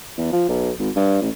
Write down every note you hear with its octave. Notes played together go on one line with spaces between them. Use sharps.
E2
F3
B1
G#1
G2
A1